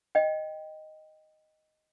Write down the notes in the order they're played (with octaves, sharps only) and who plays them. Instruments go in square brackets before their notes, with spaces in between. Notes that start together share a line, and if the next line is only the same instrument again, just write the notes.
[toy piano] D#5 G5